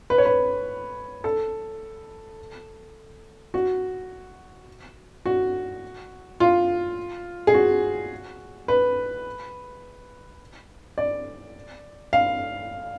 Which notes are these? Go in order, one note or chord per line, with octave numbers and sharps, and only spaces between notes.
B4
C#5
B4
A4
F#4
F#4
F4
G#4
F#4
B4
D5
F5